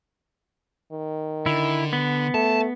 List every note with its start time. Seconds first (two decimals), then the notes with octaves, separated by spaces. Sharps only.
0.92 D#3
1.46 D3 E4
1.93 B3
2.34 A3 A5